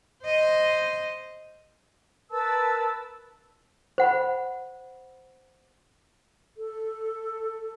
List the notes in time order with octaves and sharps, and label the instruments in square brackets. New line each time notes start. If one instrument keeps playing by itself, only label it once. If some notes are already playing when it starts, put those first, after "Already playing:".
[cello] C5 D#5
[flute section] A#4 B4 A5 E6
[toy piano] C5 F#5 B5
[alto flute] A4